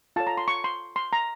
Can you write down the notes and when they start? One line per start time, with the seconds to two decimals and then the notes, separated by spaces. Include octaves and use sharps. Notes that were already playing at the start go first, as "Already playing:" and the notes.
0.16 F4 A4 C#5 A5
0.27 A#5
0.37 C6
0.48 C#6
0.64 C6
0.96 C6
1.13 A#5